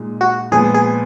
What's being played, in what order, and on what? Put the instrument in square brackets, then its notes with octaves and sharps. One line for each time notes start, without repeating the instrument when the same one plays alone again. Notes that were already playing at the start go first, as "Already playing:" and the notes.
Already playing: [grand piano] A#2 G#3 D#4
[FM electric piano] F#4
[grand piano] A#2 F3 G#3 B3 [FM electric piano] G#4
[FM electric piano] G#4